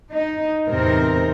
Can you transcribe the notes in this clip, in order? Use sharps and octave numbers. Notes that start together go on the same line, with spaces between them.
D#4
E2 A2 C3 C4 D#4 A#4